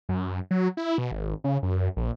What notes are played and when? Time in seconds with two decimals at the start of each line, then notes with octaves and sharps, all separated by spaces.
0.09 F#2
0.51 F#3
0.77 E4
0.98 B2
1.12 G#1
1.44 C#3
1.63 F#2
1.97 A#1